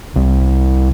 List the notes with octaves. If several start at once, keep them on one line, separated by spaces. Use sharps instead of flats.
C2